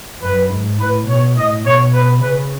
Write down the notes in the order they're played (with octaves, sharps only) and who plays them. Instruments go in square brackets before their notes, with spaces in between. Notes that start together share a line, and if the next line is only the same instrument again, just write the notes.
[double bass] F#2 [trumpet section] B4
[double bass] G#2
[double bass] A2 [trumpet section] B4
[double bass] B2 [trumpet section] C#5
[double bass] A2 [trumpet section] D#5
[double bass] B2 [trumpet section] C#5
[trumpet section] B4
[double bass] C#3 [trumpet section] B4